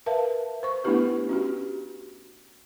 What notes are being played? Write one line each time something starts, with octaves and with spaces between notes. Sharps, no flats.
A#4 B4 E5 F5 A5
C5 C#6
A3 B3 D4 E4 G4 B4
C#4 F#4 G4